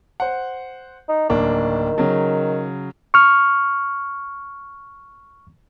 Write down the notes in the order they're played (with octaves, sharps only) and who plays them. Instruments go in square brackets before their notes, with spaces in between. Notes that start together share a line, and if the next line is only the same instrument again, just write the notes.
[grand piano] C5 F#5
[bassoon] D#4
[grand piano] D1 A#3 D4 [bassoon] D#3
[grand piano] C#3 F#3
[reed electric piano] C#6 F6